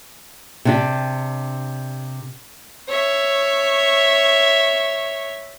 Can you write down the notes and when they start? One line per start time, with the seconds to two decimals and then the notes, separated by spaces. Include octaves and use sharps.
0.65 C3 D4 G4
2.89 C#5 E5